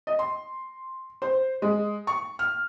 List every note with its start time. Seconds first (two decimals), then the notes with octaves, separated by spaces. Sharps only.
0.07 D#5
0.19 C6
1.22 C5
1.62 G#3
2.07 C#6
2.39 F6